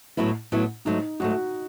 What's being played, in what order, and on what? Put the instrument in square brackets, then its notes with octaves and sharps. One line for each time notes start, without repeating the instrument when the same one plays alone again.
[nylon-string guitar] A2 F#3 B3 E4
A2 F#3 B3 E4
[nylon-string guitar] G#2 F#3 A3 [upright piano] D#4
[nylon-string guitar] G#2 F#3 A3 [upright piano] F#4